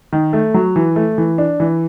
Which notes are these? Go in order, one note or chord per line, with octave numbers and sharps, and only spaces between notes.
D#3
A3
F#3
E3
A3
E3
D4
E3